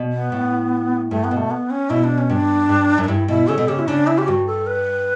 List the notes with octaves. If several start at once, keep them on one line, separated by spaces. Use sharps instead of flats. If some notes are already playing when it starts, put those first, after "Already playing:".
Already playing: B2
B3
A2
G2 A3
B3
B2
A3
B3
C#4
B2 E4
D4
C#4
G2 D4
G2
F#2
D4
G2 E4
B2 E4
C#3 A4
B2
C#3 G4
E4
C#3 D4
E4
G4
G2 F#4
A4
B4